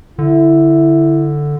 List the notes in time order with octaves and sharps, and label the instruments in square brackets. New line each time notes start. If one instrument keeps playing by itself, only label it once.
[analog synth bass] D3 [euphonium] E4